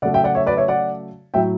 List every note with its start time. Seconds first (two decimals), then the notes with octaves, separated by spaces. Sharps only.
0.02 C#3 F#3 A3 D5 F#5
0.14 E5 G5
0.24 D5 F#5
0.35 C#5 E5
0.46 B4 D5
0.57 C#5 E5
0.68 D5 F#5
1.34 A2 F#3 A3 E5 G5